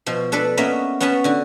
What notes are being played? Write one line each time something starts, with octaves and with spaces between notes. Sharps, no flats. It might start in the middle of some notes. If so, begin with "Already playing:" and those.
B2 F3
D4 A4 B4 D5
A#3 B3 C#4 D#5 E5
B3 C#4 F#5 A5 B5
D3 F#4